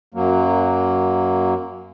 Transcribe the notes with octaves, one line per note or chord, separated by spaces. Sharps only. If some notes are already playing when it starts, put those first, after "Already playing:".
F#2 F#3 A#3